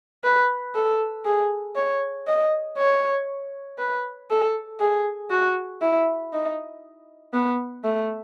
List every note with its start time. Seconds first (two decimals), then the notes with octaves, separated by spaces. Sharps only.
0.24 B4
0.75 A4
1.25 G#4
1.76 C#5
2.27 D#5
2.78 C#5
3.79 B4
4.30 A4
4.80 G#4
5.30 F#4
5.81 E4
6.33 D#4
7.33 B3
7.84 A3